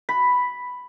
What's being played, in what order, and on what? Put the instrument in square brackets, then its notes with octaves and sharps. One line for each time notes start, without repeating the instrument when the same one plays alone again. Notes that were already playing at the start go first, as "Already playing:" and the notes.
[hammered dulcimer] B5